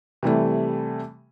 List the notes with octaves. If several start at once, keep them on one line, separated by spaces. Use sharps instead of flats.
C3 E3 G3 A3